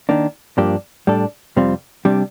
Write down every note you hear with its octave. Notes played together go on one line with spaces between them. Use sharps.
D#3 A#3 D4
G2 F3 A#3 D4 G4
A2 G3 D4 A4
F2 C3 G3 C4 F4
C3 G3 D4